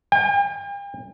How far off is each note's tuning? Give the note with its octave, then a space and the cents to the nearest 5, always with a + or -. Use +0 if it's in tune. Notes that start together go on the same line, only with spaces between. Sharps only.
G5 +45